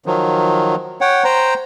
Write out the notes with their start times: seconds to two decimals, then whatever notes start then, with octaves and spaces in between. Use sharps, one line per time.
0.06 D#3 F3 F#3
1.01 C#5 F#5 G5
1.24 C5 G5 A#5